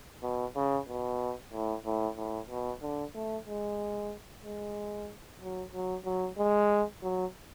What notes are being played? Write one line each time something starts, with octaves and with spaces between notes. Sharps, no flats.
B2
C#3
B2
A2
A2
A2
B2
D3
A3
G#3
G#3
F#3
F#3
F#3
G#3
F#3